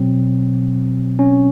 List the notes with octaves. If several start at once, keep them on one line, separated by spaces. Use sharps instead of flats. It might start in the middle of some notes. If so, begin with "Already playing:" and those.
Already playing: B2 F#3 C4
C#4